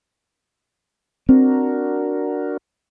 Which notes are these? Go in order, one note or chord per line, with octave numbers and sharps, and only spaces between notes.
C4 D4 F#4 A#4